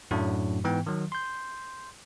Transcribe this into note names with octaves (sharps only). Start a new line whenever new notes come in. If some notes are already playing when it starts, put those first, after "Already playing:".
F#2 A2 F#3 A3 D4 F#4
G#2 E3 B3 G5
D#3 F#3
C6 G6